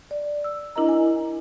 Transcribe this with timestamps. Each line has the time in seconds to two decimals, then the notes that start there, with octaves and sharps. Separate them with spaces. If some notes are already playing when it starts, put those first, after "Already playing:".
0.11 D5
0.44 E6
0.76 D4 E4 A#4 D#5 A#5
0.89 G#5